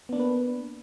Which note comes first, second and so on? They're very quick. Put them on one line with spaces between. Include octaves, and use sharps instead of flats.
B3 D4 A#3 B4